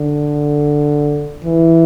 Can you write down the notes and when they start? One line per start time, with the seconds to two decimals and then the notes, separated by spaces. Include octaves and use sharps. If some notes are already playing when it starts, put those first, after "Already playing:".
Already playing: D3
1.44 E3